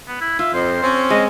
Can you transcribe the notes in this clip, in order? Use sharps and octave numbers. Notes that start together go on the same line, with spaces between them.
B3
E4
F4 E5
F2 C5
C4 C#4
G#3 D#5